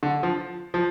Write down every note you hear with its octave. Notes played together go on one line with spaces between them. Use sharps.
D3
F3
F3